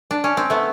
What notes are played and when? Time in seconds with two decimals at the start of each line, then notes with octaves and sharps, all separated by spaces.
0.11 D4
0.24 C#4
0.37 C4
0.50 A3 B3